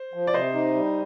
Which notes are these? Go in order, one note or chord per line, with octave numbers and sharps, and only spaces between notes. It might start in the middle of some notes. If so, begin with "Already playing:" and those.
Already playing: C5
F3
D5
C3 C5 D#5
D#4
G3